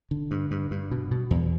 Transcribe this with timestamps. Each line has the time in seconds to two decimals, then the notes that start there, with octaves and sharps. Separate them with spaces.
0.11 D3
0.31 G2
0.51 G2
0.71 G2
0.91 B2
1.11 B2
1.31 E2